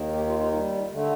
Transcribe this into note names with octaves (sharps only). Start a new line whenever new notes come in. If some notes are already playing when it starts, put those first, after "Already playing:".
Already playing: D#2 D#3
G4
F4
D#4
G3
D3 A3